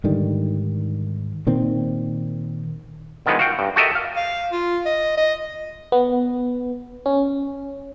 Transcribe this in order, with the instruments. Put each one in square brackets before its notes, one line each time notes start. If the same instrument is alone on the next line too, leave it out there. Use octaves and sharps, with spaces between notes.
[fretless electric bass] G#2 D3 D#3 G3
A#2 D#3 C4
[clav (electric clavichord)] D3 D#3 F3 G#3 B3
F#4 F5 G5
G2
F#4 G4 A4 A#4 D#5 E5
F5
[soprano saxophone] F5
F4
D#5
D#5
[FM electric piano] B3
C#4